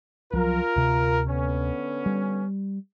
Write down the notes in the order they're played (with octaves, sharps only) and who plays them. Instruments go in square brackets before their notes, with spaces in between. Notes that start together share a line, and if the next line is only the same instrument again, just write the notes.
[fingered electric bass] C2 F3 F#3 [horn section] F4 A#4
[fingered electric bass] D2 C3
[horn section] D3 B3 C#4
[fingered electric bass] G3